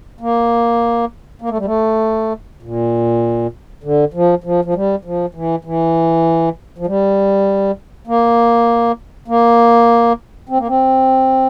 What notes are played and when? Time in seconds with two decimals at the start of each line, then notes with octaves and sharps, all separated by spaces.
0.20 A#3
1.42 A#3
1.50 A3
1.58 G3
1.65 A3
2.62 A#2
3.84 D3
4.14 F3
4.44 F3
4.65 F3
4.74 G3
5.05 F3
5.34 E3
5.65 E3
6.78 F3
6.87 G3
8.07 A#3
9.28 A#3
10.49 C4
10.58 A#3
10.67 C4